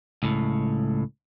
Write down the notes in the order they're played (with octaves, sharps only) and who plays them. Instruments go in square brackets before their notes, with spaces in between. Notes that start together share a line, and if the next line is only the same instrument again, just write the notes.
[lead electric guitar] C#2 A2